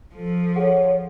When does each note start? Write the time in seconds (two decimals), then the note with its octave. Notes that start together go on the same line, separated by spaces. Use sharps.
0.15 F3 A4
0.56 G#4 A4 C#5 F#5